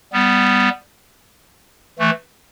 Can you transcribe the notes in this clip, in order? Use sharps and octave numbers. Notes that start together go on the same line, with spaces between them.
G3 B3
E3 A3